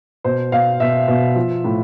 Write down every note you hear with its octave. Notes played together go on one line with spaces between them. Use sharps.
B2 C5
B2 F5
B2 E5
B2
F3
A2